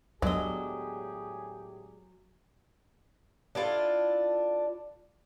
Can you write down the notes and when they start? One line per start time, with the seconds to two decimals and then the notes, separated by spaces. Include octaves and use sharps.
0.22 A2 D3 F#3 G#3 B3 G4 G#4 D#5
3.55 D4 E4 F4 A4